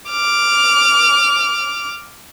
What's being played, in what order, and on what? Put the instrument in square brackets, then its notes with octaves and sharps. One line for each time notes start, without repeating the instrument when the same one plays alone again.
[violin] D6 F6